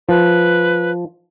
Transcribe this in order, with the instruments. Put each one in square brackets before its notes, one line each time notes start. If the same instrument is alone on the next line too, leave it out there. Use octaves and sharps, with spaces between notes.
[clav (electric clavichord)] F3 [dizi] B4